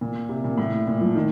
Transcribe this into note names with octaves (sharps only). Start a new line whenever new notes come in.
A#2
C3
A#2
A2
A#2
F3
D#3